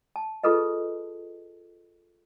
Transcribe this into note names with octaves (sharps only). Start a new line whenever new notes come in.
A5
F4 G#4 A4 B4 D#5